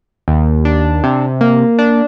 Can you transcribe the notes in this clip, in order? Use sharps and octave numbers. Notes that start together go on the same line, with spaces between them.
D#2
D4
C3
A#3
D4